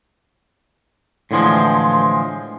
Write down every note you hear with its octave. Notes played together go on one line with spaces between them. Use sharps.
A2 D3 E3 F3 G#3